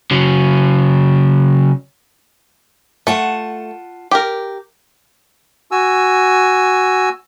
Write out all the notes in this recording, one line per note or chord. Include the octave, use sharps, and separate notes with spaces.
C#3 F#3
A3 F4 F#5 A5
G4 A#4
F#4 G#5 E6